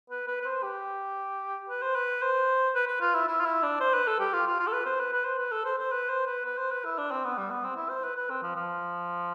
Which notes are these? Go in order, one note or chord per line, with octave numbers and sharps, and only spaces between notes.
B4
B4
B4
C5
G4
B4
C5
B4
C5
B4
B4
F4
E4
E4
F4
E4
D4
C5
B4
A4
G4
F4
F4
F4
A4
B4
C5
B4
B4
C5
B4
A4
C5
C5
B4
C5
B4
B4
C5
B4
E4
D4
C4
B3
G3
B3
C4
E4
C5
B4
B4
C4
F3
F3